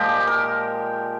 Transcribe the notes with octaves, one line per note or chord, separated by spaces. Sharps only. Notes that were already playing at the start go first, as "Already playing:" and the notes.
Already playing: A#2 F3 G#3 G4 A#4
A#4